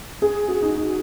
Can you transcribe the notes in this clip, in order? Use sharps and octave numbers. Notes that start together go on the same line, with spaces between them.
G#4
F#4
D#4
D#4